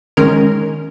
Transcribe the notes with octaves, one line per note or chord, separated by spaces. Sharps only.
D#3 G#3 C#4 A#4